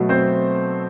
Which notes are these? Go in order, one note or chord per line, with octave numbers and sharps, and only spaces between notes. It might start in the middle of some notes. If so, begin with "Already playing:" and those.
Already playing: B2 F#3 A3
C4 C5